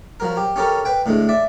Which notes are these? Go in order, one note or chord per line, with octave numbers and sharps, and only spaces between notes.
F3 F#3 A#4
G4
C#4 G4 A4 A#4
B4 G5
A2 D3 G#3
D5 E5